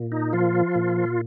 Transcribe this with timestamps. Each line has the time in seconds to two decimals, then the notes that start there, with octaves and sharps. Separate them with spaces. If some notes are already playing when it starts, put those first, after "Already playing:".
Already playing: A#2
0.12 D#4
0.33 F3 F4
0.75 A#2